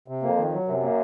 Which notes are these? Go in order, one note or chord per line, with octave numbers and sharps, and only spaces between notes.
C3
F2 A#3
D#3
F#3
F#2 C3
A#3